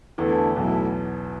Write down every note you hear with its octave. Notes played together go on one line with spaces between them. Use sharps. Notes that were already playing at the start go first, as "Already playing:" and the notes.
E2 D3 E3 A3 E4 A4
B1 B2 A3 E4 A4